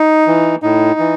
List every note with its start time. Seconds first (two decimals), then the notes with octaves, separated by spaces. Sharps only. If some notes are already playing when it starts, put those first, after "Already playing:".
Already playing: D#4
0.27 E3
0.62 A2 D#4
0.99 E3